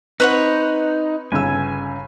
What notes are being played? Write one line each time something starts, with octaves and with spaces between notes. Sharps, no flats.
C4 D#4 B4 C#5 F#5
G1 C#3 G#5 E6